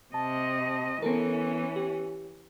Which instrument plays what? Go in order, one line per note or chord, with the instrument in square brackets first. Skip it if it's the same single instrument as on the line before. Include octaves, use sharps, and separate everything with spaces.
[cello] C3 D#5 [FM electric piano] A5
[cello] E3 C#4 [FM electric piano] B3 A4 A#4
[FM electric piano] G4